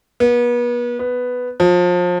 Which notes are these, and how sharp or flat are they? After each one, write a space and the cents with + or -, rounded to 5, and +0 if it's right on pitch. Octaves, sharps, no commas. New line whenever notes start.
B3 -35
B3 +5
F3 +30